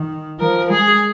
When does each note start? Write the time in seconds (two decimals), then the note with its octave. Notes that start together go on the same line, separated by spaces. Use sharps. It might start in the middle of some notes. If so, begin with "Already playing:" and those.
Already playing: D#3
0.39 F3 A#4
0.70 G#3 G#4